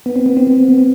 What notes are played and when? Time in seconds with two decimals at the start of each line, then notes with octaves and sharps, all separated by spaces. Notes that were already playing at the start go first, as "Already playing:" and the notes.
0.06 B3
0.16 C4
0.26 B3
0.37 C4
0.47 B3
0.58 C4
0.69 B3
0.78 C4